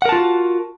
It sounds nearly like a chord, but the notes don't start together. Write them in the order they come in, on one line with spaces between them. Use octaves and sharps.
F#5 A#4 A5 F4 F#4